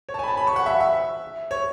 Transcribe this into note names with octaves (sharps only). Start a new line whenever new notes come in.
C#5
A5
G#5
B5
A5
B5
C#6
F#5
E5
E5
C#5